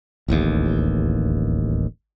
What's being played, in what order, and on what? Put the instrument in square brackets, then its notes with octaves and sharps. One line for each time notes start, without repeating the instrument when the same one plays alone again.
[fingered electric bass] D1 A1 D#2